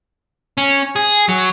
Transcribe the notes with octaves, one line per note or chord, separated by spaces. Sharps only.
C#4
G#4
F#3